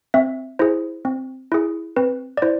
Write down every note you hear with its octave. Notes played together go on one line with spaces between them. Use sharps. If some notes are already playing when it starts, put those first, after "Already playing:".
C4 E5
E4 G#4 C5
C4
E4 G#4
C4 B4
D5
E4 C5